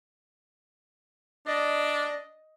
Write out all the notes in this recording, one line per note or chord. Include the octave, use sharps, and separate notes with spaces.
D4 D5 D#5